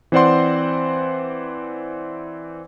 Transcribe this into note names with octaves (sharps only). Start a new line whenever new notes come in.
E3 C4 C5 D5 F#5 C6